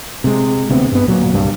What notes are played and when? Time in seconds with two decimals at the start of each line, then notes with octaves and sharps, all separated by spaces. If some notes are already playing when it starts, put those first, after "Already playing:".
0.24 C3 G#3
0.69 D2 C3 B3 C4
0.92 G2 B3
1.07 D1 A#2 F#3
1.33 C2 G2 G3